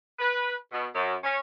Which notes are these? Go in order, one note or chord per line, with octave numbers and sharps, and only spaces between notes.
B4
B2
F#2
C#4